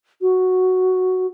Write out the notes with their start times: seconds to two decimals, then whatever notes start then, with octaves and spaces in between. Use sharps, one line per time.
0.22 F#4